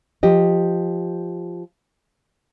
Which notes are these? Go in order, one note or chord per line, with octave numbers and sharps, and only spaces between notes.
F3 G4 D#5